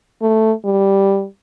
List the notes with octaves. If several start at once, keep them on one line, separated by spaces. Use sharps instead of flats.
A3
G3